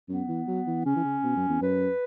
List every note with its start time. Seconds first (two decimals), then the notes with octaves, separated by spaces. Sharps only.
0.09 F#2 B3
0.28 E3
0.47 F#3
0.67 E3
0.85 C#3 C#4
0.96 E3
1.04 C#3
1.24 B2
1.36 F#2
1.49 E2
1.61 F#2 B4